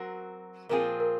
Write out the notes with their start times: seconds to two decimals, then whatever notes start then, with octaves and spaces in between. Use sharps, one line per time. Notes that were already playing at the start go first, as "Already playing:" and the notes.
Already playing: F#3 C4 F#4 A#4
0.69 A#2 F3 C4 F4 G#4 A#4
1.00 A#4